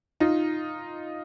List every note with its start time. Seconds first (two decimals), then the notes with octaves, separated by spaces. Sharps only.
0.20 D#4 F4